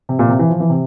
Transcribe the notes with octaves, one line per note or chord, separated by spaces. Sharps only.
C3
A#2
C3
E3
F3
E3
C3